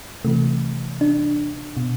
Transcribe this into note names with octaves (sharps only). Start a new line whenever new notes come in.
C3 E3 A3
D4
B2